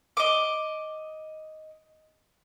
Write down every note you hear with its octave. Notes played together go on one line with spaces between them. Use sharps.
D#5 D6